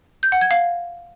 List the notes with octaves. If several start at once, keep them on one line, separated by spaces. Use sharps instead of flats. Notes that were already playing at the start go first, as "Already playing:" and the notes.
G6
F#5
G#6
F5